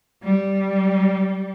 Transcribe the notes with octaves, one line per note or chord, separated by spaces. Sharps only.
G3